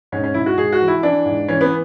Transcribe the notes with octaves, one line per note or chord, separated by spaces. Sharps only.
G#2 C#4
C#4
G#2 E4
F#4
G#2 G#4
F#4
E3
E4
E3 D4
G#2
E3 C#4
B3